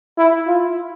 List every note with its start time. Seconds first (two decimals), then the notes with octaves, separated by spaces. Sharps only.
0.18 E4
0.47 F4